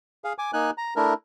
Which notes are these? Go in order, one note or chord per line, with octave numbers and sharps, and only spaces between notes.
G#4 F5
G#5 D6
A#3 D#4 G#5 F#6
A#5
A3 D4 E4 A#4